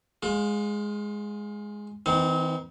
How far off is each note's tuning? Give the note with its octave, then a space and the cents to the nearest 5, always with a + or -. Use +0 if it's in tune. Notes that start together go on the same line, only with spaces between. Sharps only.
G#3 +0 F4 +30
E3 -40 C4 -30 D#4 +0